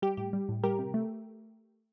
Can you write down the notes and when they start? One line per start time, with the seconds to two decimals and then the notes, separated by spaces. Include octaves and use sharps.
0.02 G3 G4
0.17 A2 G4
0.33 G3
0.49 A2
0.63 G3 G4 A#4
0.79 C3
0.94 A3